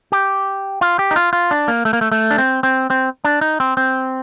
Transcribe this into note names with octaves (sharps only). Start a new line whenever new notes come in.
G4
F4
G4
D#4
F4
F4
D4
A#3
A3
A#3
A3
A3
D4
C4
C4
C4
D4
D#4
C4
C4